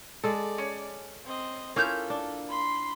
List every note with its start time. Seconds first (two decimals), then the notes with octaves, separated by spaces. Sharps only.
0.24 G#3 A4 D5
0.58 C#4
1.26 C4 D#5
1.76 A#3 C#4 E4 F4 A4 F6 G6
2.10 D4
2.49 B5 C6